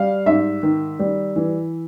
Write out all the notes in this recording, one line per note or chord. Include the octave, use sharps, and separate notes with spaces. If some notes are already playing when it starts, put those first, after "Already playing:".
Already playing: G3 F5
G#2 E5
D#3
G3
E3